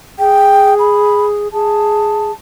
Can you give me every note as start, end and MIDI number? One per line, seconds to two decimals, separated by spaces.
0.19 1.48 68
0.19 0.74 79
0.79 1.26 83
1.53 2.32 68
1.53 2.32 81